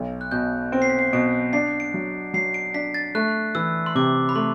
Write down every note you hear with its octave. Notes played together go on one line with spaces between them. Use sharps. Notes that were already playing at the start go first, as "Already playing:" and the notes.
Already playing: B1
F#6
B2 G6
C4 D7
C7
B6
C7
B2 D7
D4 C7
D7
F#3
F#3 C7
D7
D4 B6
A6
A3 F#6
E3 E6
C6
C3 D6
B5
A3 C6